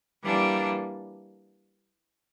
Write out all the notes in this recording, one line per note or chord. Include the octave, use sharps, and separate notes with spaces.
E3 G3 A#3 D4